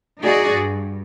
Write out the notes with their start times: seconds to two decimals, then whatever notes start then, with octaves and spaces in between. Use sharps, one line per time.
0.21 D#4 F#4 G#4 D5
0.53 G2